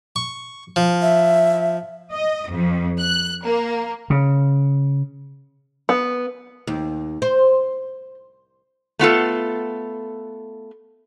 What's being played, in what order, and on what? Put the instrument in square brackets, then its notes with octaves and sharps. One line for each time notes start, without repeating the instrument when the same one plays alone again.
[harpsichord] C#6
F3
[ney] E5
[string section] D#5
F2
F#6
A#3
[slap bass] C#3
[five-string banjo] B3
[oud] D#2
C5
[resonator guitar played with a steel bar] A3 B3 F4 A4